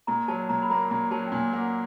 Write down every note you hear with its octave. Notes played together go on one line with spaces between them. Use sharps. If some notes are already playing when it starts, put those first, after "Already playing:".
A#2 A#5
F#3 A5
A#2 A#5
B5
A#3 A#5
A#2 A#5
F#3 A5
G5
A#2 G#5
A#3 F#5